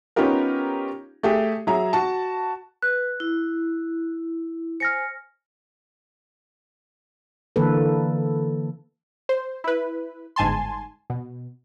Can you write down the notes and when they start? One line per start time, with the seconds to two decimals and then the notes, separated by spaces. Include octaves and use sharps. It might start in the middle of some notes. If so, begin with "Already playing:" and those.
0.16 B3 C#4 D#4 F4 G4 A#4
1.23 A3 G4 G#4
1.67 F#3 G#4 E5 A#5
1.93 F#4 A5
2.82 B4 F#6
3.20 E4
4.80 C5 G#5 F6 A#6 C#7
7.56 D3 E3 A#3 A4 B4
9.29 C5
9.64 E4 B4
10.36 G1 G#2 G#5 A5 C6
11.10 B2